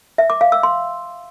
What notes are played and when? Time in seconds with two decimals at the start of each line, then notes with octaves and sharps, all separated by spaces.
0.18 E5
0.30 D6
0.41 F5
0.52 E6
0.63 C6